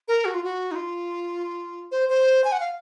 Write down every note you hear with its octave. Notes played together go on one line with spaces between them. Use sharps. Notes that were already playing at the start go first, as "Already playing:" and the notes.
A#4
F#4
F4
F#4
D#4
F4
C5
C5
G#5
F#5
F5